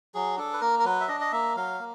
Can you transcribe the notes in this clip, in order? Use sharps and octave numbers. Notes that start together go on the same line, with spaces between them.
F#3 G#4
D4 A4
B4
A#3 A#4
A#4
F#3 B4
E5
D4 D#5
D#5
A#3 E5
F#3 F5
A#3